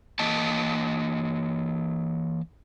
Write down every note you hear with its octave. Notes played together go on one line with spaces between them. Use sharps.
E3 A#3 D#5 A5